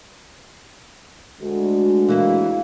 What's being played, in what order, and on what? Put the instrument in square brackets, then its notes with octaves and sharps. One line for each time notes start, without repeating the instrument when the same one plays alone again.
[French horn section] D2 G#3 F#4
[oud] E3 A#3 E4